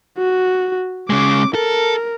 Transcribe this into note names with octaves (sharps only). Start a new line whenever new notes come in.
F#4
C#3 G#3 D6
A4 A#4